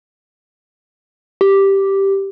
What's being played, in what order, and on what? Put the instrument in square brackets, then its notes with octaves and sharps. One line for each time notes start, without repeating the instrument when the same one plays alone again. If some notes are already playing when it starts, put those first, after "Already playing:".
[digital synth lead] G4